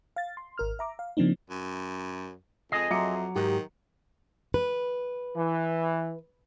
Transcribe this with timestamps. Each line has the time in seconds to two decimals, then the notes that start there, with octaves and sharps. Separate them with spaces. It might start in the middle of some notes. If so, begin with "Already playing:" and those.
0.16 F5 A6
0.37 C6
0.58 G#1 A#4 F6
0.79 E5 A#5 D6
0.99 F5
1.17 C#3 F3 A#3 C4 D4 D#4
1.50 F#2
2.72 F2 G#4 D#5 C7
2.91 F2 F#3 E5 A#5 C6 D6 C#7
3.36 G#2 D#3 G4
4.54 B4
5.36 E3